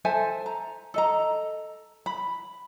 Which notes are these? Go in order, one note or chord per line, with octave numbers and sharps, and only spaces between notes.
A4 C5 E5 G#5
A#5
A4 D#5 A#5
B5